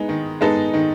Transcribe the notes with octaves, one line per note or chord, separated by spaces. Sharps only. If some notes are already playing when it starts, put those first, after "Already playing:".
Already playing: G#3 B3 D#4
D#3
G#3 B3 D#4 A4
D#3